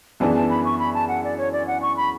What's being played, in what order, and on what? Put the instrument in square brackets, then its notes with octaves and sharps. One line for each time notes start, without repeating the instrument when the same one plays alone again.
[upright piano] F#2 E3 B3 D4 G#4 [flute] A5
[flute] A5
B5
C#6
B5
A5
F#5
D5
C#5
D5
F#5
C#6
B5